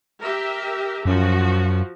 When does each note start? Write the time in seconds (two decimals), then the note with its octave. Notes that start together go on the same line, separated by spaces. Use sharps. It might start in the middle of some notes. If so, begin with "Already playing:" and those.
0.22 G4 A#4 E5
1.05 F#2 F3 F#4